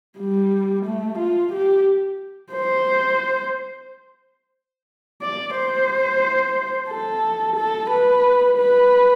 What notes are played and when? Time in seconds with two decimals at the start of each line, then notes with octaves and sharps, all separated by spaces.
0.19 G3
0.85 A3
1.19 F4
1.53 G4
2.52 C5
5.22 D5
5.55 C5
6.90 A4
7.56 A4
7.90 B4
8.57 B4